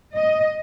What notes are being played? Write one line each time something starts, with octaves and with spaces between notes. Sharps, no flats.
D#5